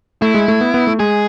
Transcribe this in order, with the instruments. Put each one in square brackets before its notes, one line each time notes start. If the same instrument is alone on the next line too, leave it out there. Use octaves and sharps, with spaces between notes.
[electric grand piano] A3 [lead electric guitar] E4
[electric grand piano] G#3
A3
B3
B3
A3
[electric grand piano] G#3 [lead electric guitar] G#4